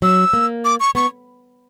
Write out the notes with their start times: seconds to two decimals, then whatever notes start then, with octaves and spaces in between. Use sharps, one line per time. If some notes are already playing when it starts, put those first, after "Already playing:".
0.02 F#3 E6
0.33 A#3
0.65 D6
0.80 C#6
0.95 B3 C#6